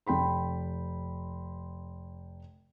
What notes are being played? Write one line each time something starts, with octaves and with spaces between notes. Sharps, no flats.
F1 G5 B5 C6